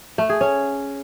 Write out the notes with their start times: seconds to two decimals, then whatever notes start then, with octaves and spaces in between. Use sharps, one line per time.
0.18 A3
0.29 G#4
0.41 C#4